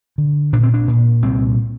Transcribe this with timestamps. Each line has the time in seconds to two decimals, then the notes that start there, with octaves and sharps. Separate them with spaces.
0.18 D3
0.53 A#2 D4
0.63 C4
0.74 D4
0.88 A#2
1.22 C2 C4